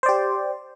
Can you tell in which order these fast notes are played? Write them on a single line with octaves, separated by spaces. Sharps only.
C5 D5 G4